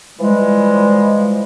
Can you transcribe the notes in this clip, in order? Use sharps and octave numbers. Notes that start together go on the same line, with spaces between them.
E3 F3 G3 G#3